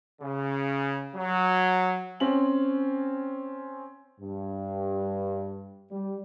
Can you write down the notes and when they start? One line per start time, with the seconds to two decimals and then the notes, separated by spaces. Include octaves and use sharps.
0.21 C#3
1.15 F#3
2.20 C4 C#4 G#5 F#7
4.21 G2
5.91 G3